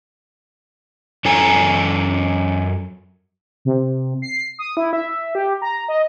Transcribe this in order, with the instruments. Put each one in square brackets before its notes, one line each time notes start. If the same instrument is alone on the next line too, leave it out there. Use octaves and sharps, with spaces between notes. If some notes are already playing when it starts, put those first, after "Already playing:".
[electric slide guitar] F#2 C#4 A4 G#5 A#5
[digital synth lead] C3
C7
D#6
E4
E5
G4
A#5
D#5